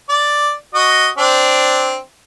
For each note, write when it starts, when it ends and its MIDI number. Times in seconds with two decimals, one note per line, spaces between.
0.09 0.54 74
0.75 1.08 66
0.75 1.08 75
1.18 1.98 60
1.18 1.98 62